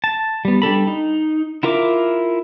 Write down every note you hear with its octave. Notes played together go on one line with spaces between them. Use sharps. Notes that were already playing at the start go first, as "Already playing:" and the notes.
A5
G3 B3
G3 D4 A4 B5
D#4
E4 F4 A#4 E5 D6